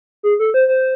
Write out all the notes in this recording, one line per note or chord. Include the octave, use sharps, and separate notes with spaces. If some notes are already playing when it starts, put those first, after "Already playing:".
G#4
A4
C5
C5